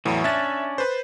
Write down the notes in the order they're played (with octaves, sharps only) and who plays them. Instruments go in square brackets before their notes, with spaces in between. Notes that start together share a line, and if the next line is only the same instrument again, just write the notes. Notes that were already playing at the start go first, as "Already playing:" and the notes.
[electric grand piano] E2 A2 [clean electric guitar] E3 F#3
[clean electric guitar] C#4 D4 [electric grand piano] E5 A6
[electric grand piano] B4 C5